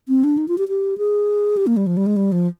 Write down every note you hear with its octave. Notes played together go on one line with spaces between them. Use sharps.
C4
D4
D#4
F4
G4
G4
G#4
G4
A#3
G3
F3
G3
G#3
G3
F3